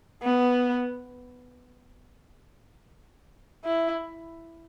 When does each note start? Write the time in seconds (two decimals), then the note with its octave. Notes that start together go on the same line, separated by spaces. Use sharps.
0.23 B3
3.65 E4